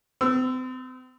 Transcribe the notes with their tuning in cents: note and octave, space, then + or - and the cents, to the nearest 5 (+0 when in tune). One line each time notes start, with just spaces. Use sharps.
C4 -40 E6 +0